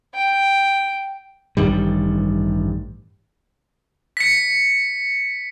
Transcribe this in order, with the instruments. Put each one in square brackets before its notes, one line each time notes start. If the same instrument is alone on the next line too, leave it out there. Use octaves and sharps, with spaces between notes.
[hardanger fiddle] G5
[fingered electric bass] A1 G2 D#3 G3
[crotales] B6 C#7